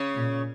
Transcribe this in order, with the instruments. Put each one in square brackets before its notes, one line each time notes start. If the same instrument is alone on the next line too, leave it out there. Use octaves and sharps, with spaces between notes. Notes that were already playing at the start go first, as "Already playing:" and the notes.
Already playing: [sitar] C#3 C#4
[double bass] A#2